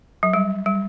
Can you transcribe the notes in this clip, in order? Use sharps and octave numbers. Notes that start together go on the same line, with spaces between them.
F#3
G3
G3